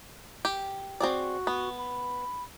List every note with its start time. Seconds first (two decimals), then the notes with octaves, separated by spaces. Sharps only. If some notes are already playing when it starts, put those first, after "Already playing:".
0.45 G4
1.00 C4 F#4 G#4 D5
1.47 B3
1.78 B5